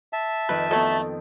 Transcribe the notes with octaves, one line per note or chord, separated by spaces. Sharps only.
E5 A5
F2 D#3 B4
F#3 A3 B3 A4